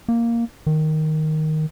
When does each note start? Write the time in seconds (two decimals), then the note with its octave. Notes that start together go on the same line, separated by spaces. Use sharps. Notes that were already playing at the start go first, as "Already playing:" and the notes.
0.09 A#3
0.67 D#3